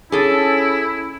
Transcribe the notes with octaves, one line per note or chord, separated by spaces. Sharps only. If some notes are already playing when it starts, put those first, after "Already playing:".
C#4 E4 G#4 A4